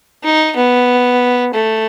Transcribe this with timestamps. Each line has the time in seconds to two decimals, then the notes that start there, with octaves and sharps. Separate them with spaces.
0.24 D#4
0.56 B3
1.54 A3